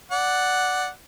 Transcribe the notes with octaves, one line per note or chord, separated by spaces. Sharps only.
D5 F#5